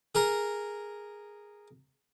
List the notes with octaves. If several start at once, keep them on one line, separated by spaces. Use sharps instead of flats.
G#4 A#4